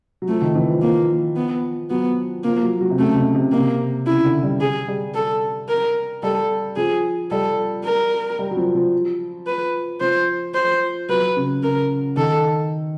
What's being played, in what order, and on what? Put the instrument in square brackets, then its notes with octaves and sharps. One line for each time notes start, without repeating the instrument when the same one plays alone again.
[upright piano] F#3
[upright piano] F3 [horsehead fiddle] A3
[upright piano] D#3
E3
F3
[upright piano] F3 [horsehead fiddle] A#3
[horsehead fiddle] B3
[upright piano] F#3 [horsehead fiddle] B3
[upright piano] F3 [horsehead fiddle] A#3
[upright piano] F#3
F#3
C3
[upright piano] C#3 [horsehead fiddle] A3
[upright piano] C3
C3
[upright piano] C3 [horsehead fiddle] A#3
[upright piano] C#3 [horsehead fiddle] E4
[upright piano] D3
G3
[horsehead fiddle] G#4
[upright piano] G3
[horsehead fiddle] A4
A#4
[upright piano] G3 [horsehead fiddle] A4
[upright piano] F3 [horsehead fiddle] G#4
[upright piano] G3 [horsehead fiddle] A4
[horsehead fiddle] A#4
[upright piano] G3
F#3
F3
F3
[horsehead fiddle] B4
[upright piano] F3 [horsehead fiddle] C5
[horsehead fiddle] C5
[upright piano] F#3 [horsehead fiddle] B4
[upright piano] C#3
[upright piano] C#3 [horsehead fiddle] A#4
[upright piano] D#3 [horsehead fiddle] A4